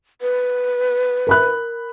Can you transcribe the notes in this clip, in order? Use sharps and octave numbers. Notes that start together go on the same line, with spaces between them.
B4
A#4 B5 F#6